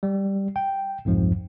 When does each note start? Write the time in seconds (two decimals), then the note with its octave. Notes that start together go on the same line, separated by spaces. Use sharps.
0.03 G3
0.56 G5
1.05 C2 F2 G#2 F3